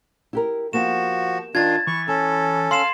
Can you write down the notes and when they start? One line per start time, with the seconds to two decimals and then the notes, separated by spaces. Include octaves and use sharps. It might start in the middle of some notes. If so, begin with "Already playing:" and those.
0.33 E4 G4 A#4
0.73 F3 A#3 B3 F#4 G4 E7
1.55 D#3 D4 F4 G#6 A6
1.87 E3 C#6
2.08 C#4 A4 A5
2.71 F5 C6 C7 E7